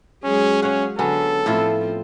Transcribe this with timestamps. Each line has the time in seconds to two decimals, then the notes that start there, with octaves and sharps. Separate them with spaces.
0.24 F#3 G#3 C#4 G#4
0.62 C#4 C#5 F5 F#5
0.99 D3 F#3 B3 C#4 A4
1.46 A2 F3 C4 E4 F4